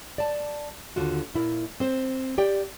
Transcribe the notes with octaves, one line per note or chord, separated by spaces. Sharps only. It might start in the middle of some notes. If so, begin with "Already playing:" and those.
D5 A5
D#2 D3 F4 F#4
A#2 E4 A#4
C4 C5
G4 D5 G5